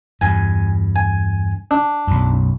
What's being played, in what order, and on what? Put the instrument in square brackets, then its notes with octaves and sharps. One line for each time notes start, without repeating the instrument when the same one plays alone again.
[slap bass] E2 G2 [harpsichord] G#5
[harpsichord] G#5
D4
[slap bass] B1 F#2